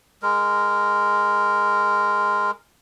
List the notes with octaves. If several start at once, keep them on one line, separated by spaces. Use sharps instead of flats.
G#3 A#4